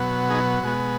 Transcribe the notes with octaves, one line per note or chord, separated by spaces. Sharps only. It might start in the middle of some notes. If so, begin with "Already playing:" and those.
Already playing: B2 F#3 B3
D#4 G#4
B2 G#3 B3 F#4